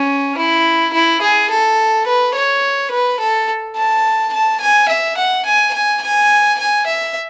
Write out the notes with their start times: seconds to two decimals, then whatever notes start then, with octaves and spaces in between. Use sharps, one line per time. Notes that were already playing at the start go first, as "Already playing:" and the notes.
Already playing: C#4
0.37 E4
0.93 E4
1.22 G#4
1.50 A4
2.07 B4
2.35 C#5
2.91 B4
3.20 A4
3.76 A5
4.33 A5
4.60 G#5
4.89 E5
5.17 F#5
5.45 G#5
5.73 G#5
6.01 G#5
6.58 G#5
6.86 E5